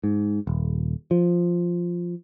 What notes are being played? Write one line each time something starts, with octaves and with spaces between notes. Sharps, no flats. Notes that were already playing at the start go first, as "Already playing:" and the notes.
G#2
D#1
F3